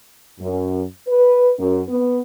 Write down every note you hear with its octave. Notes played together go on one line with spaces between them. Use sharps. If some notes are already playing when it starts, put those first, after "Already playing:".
F#2
B4
F#2
B3